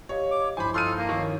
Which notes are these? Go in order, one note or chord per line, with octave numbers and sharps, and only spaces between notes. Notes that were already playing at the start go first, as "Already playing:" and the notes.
G4 C#5 D#5 F5
D6
G2 F3 E4 C5 G#5 B5
D#4 F4 A4 C6 F6 D#7
A#3
D#3 C#4